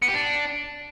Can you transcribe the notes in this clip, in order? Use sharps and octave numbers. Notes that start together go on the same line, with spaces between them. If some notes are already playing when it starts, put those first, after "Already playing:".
B3
G4
D4